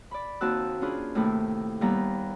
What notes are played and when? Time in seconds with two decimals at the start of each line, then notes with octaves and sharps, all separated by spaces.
0.11 D5 B5
0.41 D#2 C4 F#4 A5 E6 F#6
0.81 C#4 D4 F4 G#4 B4
1.15 A2 C3 D#3 A3 A#3 E4
1.81 D#2 G3 B3 A#5 B5